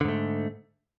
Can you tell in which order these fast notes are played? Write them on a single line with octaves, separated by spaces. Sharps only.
D3 G#2 A3